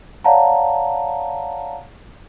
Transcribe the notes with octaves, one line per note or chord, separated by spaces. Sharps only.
C#5 D5 F5 F#5 A5 A#5